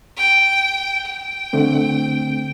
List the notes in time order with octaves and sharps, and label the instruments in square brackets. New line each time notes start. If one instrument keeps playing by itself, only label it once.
[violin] G5
G5
[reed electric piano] D3 A3 C4